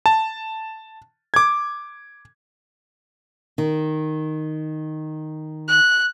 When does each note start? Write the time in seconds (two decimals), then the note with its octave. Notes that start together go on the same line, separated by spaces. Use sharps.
0.06 A5
1.34 D6 G#6
3.58 D#3
5.68 F#6